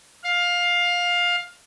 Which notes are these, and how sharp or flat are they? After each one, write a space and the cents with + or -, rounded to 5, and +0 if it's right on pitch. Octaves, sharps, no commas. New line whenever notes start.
F5 +15